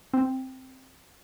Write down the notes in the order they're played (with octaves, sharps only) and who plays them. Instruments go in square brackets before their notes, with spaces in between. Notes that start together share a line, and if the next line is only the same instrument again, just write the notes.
[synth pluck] C4